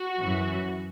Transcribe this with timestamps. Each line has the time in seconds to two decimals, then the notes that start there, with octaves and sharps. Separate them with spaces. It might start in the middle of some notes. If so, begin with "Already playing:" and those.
Already playing: F#4
0.20 F#2 E3